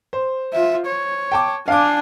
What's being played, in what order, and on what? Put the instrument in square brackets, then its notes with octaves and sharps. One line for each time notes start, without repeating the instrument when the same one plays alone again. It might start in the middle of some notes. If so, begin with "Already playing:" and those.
[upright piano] C5
[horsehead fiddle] F4 E5
C#5
[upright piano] G5 A5 D6
[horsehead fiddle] D4 G#5 [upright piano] F5 D6